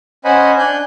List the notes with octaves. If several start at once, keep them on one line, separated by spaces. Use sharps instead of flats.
C#4 C5 D#5 F#5 G#5 B5
D4 G#5 F#6 G6